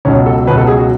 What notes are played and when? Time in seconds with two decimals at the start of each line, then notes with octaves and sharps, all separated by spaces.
0.05 C#2 B2 F#3 C#4
0.26 A4
0.46 C#2 B2 F#3 B4
0.57 A4
0.67 G#4
0.78 F#4